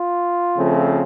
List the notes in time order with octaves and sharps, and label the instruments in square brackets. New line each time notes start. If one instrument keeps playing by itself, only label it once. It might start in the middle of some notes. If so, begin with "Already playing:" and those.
Already playing: [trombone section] F4
C#3 F3 A3 C4